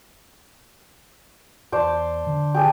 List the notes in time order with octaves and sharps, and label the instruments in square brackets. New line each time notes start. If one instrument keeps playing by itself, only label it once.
[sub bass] E2 [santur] C5 D5 A5
[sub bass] D3
[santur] G4 G#4 A5